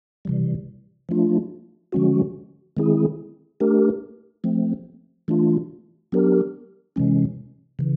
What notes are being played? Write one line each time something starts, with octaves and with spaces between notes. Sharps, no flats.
C3 E3 G3
F3 A3 D4 F4
D3 F3 G#3 C#4 F#4
D#3 G#3 C4 E4 G#4
A3 D4 G4 A#4
F3 A3 C4
E3 A3 D4 F4
F#3 B3 D4 G4 A#4
C3 E3 G#3 C#4
C#3 E3